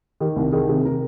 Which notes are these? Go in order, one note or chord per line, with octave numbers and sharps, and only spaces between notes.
D#3 G4
C2
D#3 G#4
C3
C3 A#4